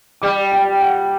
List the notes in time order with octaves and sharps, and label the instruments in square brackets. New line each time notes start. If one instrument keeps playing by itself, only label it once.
[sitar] G3 [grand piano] D6
[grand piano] G5
F#5